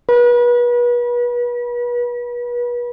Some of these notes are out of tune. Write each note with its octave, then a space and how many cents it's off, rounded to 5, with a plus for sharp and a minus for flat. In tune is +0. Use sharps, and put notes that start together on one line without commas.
B4 -35